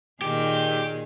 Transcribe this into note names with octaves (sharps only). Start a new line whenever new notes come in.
A#2 D#3 G4 G#4